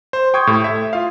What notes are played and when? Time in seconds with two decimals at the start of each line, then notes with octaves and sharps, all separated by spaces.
0.13 C5
0.34 G5 C6 C#6 D#6 G6 G#6
0.47 A2 G4 A4
0.64 E5
0.93 F4 F5